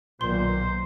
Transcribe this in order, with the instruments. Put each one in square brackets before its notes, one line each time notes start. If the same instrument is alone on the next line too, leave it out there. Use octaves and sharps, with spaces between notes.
[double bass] B1 D#3 [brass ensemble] A#2 [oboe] C5 [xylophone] C6